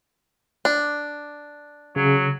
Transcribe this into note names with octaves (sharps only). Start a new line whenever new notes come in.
D4
C#3 F#3